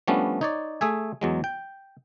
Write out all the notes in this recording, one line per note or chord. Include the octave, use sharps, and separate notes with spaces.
F3 G3 A3 B3 C#4 D4
D#4 C#5 D5
A3 G#4 E5 G#5
E2 F#3 G#3
G5